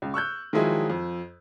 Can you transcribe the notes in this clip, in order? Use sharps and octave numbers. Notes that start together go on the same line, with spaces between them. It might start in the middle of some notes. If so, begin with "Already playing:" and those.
C#2
C#6 E6 F#6 G6
D#3 F3 F#3 G#3 E4 G#4
F2